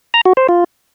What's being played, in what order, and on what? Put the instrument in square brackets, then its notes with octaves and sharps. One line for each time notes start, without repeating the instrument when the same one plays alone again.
[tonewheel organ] A#5
F#4
C5
F4